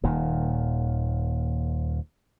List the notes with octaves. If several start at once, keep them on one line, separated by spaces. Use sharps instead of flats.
D#1 A#2 D#3